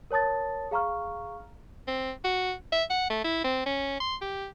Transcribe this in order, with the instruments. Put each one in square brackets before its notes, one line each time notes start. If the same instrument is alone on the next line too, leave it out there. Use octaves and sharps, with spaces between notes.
[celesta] A#4 C#5 A5 D#6 A6
G#4 F5 A#5 C#6 F6
[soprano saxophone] C4
F#4
E5
F#5
A3
E4
C4
C#4
C6
G4